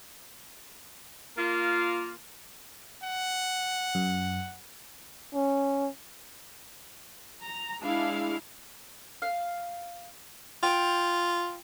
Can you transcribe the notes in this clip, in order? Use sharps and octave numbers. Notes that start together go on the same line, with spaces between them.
A#3 F4
F#5
F#2
C#4
A#5
G#3 D4 E4 F5
F5
F4 G5